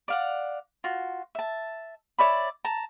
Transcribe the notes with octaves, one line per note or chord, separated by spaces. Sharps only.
D5 F5 F#5
F4 F#4
E5 A5
C#5 D5 E5 B5
A5 A#5